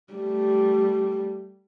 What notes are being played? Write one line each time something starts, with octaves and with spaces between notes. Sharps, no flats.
G3 A3